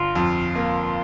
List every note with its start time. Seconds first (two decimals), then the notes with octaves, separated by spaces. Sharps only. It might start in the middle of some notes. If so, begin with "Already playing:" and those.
Already playing: G1 F4
0.15 F2
0.56 A#3